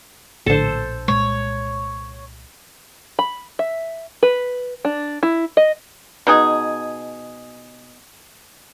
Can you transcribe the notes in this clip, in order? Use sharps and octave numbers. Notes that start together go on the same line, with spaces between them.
A#1 A2 D3 A4 C5
C2 A#2 G#3 C#5
B5
E5
B4
D4
E4
D#5
B2 D#4 G#4